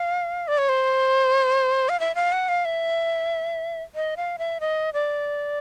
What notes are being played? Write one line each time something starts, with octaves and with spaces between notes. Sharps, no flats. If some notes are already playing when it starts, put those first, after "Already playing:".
Already playing: F5
D5
C#5
C5
F5
E5
F5
F#5
F5
E5
D#5
F5
E5
D#5
D5